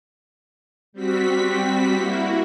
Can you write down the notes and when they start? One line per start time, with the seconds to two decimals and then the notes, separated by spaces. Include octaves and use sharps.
0.93 G3 C4 F#4 B6
1.94 A#3 E4 F#4